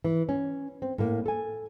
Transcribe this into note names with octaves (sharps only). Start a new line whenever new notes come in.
E3
C#4
C4
A2 A#3
A4 G#5